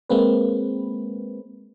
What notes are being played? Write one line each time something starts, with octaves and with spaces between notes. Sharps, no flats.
G#3 A#3 C4 B4